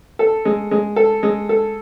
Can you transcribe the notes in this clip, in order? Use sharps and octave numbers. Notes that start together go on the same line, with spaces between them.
A4
G#3
G#3
A4
G#3
A4